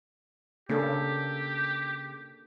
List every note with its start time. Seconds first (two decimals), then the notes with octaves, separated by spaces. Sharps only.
0.69 C#3 A#3 D4 G4 A4